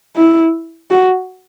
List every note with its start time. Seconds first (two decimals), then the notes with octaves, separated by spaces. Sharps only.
0.16 E4
0.91 F#4